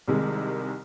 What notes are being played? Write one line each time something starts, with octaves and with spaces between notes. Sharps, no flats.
C2 C3 D#3 G#3